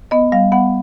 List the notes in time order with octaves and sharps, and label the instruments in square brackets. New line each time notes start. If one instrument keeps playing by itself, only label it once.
[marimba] B3 D#5
G3 F5
B3 F#5